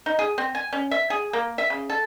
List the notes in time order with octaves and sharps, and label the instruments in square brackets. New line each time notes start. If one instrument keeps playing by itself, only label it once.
[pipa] D#4
G#4
C4
G#5
C#4
E5
G#4
A#3
E5
C#3
A4